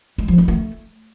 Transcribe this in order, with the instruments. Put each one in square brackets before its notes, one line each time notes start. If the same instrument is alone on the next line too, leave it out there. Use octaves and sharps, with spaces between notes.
[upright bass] G#3
F3
D#4
A3